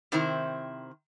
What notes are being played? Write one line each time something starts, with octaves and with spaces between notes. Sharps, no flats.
C3 D#3 C4 E4 C5